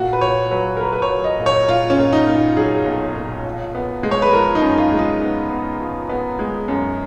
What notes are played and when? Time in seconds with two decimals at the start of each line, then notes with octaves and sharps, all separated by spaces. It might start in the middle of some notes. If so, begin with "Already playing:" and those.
Already playing: A#2 F#4
0.13 B4
0.21 A#2 C#5
0.51 F#3 B4
0.77 A#4
0.80 A#3 B4
0.93 B4
1.02 C#5
1.10 F#3
1.24 D#5
1.39 A#2
1.46 C#5
1.68 A#2 F4
1.90 C#4
1.97 A#2
2.13 D#4
2.27 A#2
2.34 F4
2.57 F#3 G#4
2.86 B1
3.15 A#2
3.45 F3
3.75 B3
4.03 G#3
4.11 C#5
4.22 B4
4.33 F3 A#4
4.55 D#4
4.62 F#2
4.78 F4
4.92 G#3
4.99 D#4
5.21 B3
5.51 B3
5.80 F3
6.09 B3
6.39 G#3
6.68 F#2